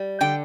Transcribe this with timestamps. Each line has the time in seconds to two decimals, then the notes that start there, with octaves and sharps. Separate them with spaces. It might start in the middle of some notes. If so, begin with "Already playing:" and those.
Already playing: G3
0.21 D3 G5